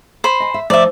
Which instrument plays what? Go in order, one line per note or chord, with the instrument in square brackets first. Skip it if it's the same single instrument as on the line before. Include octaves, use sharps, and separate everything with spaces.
[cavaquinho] C5 B5
[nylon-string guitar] D#5 G#5
E5
[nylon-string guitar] F3 A3 D#4 [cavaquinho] D5 E5